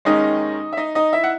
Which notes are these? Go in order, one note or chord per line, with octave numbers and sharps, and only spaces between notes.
D#2 D#3 G#3 C#4 D#4 D#5
E5
D#4 D#5
D#4 D#5
E4 E5
F#5